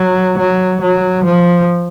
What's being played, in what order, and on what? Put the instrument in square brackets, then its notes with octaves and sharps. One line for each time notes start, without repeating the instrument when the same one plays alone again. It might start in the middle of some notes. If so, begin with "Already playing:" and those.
Already playing: [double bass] F#3
F#3
F#3
F3